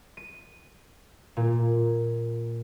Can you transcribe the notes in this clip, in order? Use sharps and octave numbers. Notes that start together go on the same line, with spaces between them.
D#7
A#2